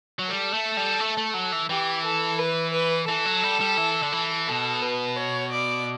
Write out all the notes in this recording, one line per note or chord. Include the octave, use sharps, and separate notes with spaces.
F#3
G3 A4
A3
G3
A3
A3
F#3
E3
E3 G4
A4
B4
B4
E3 A4
F#3
G3
G3
E3
D3
E3
B2 A4
B4
C#5
D5